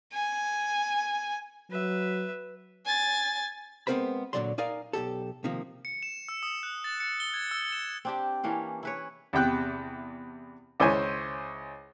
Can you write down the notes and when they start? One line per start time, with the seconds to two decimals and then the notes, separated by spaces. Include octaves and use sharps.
0.14 G#5
1.71 F#3 B4 E5
2.86 G#5 A6
3.87 G#3 B3 C4 A#4 C5 B5
4.33 A#2 D3 F3 F#3 D5 C6
4.58 D#4 A#4 D5 F5 G#5
4.93 B1 F2 G4 A4
5.44 C3 D#3 F3 A#3
5.85 C#7
6.03 E7
6.29 E6
6.43 D#6
6.63 F#6
6.84 A6
7.00 C#7
7.20 G7
7.34 G#6
7.51 E6
7.73 E7
8.05 C4 D4 G4
8.43 E3 A#3 C#4 D4
8.83 E4 B4 C#5
9.33 E2 C3 G5 F#6
10.80 C#2 E4 C5 C#5 G#5